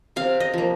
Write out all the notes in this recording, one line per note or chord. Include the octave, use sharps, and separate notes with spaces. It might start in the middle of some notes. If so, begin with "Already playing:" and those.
C3 F5
D#5
F3 A#3